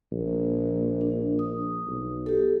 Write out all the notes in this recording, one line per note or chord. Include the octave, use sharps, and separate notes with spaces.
A#1
D4
D#6
B1
G4 A4